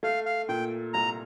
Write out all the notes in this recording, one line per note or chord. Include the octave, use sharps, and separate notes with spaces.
A3 F5
F5
A#2 G5
C2 A#5